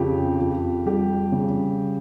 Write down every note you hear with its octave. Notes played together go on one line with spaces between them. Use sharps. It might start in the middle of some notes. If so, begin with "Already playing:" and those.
Already playing: F2 C#3 G4
F2
G3 G4
C#3